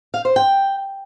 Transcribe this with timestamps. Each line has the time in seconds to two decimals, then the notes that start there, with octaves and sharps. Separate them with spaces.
0.14 F5
0.25 C5
0.36 G5